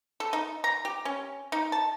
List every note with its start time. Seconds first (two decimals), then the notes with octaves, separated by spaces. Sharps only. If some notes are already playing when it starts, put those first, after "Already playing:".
0.20 A4
0.33 D#4
0.64 A#5
0.85 G4
1.05 C#4
1.52 D#4
1.72 A5